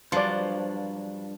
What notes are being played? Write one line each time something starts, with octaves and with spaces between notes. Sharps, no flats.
G2 F3 F#3 D4 D5 C6